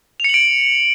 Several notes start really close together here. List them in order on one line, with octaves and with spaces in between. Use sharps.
F7 C#7 F#7 D7